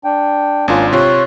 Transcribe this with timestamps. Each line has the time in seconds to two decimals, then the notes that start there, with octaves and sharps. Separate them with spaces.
0.04 D4 G5
0.68 G#1 A#3 C#4 D4 F4
0.93 C3 F4 C#5 F#6